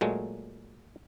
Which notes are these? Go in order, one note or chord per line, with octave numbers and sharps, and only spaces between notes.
A#2 F#3 G#3 A3